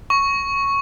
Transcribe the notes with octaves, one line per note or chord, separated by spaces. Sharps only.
C#6